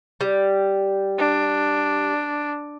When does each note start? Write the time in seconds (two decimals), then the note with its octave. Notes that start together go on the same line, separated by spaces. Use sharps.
0.21 G3
1.18 D4